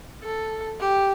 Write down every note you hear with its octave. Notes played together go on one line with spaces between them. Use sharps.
A4
G4